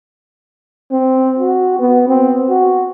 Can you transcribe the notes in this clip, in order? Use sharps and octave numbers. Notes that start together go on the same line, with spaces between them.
C4
F#4
B3
C4
F#4